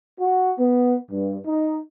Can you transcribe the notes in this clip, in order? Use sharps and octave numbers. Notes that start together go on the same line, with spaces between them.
F#4
B3
G2
D#4